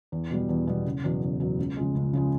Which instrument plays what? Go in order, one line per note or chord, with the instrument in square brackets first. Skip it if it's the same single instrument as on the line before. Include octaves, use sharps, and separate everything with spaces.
[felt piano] E2
B2 G3
E2
B2 G3
F#1
E2 B2 F#3
F#1
E2 B2 F#3
C#2
C#3 F3 G#3
C#2
C#3 F3 G#3